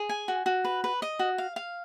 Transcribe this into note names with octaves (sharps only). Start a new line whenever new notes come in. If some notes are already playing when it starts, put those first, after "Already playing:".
Already playing: G#4
G#5
F#4
F#4
B4
B4
D#5
F#4
F5
F5